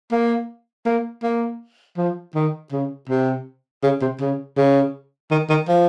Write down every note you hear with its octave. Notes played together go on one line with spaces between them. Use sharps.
A#3
A#3
A#3
F3
D#3
C#3
C3
C#3
C3
C#3
C#3
D#3
D#3
F3